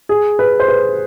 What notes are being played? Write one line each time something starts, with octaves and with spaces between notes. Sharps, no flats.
G#4
B4
C5
B4